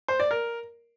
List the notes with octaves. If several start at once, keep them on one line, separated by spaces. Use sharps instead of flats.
C5
D5
A#4